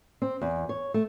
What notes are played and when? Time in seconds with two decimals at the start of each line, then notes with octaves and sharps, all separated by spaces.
0.22 C4
0.41 E2
0.69 C#5
0.94 A3